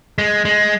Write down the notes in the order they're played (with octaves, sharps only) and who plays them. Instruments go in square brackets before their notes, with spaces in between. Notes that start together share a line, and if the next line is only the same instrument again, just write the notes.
[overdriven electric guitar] G#3
G#3